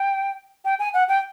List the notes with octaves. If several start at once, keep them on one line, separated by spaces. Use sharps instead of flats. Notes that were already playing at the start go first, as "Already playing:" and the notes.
Already playing: G5
G5
G#5
F#5
G5